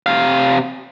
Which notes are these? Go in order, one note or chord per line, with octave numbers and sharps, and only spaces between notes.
C3 F5